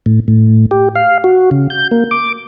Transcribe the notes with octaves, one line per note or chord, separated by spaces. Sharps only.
A2
A2
G4
F5
F#4
C#3
G6
A#3
D6